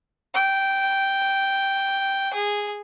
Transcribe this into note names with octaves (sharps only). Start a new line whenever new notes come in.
G5
G#4